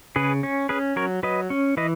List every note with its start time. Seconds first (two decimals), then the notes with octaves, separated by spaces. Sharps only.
0.16 C#3 G#4 B4
0.43 C#4
0.69 C#4 G#4 B4
0.96 F#3 A#4 C#5
1.23 F#3 B4 D#5
1.50 C#4
1.77 E3 B4 D#5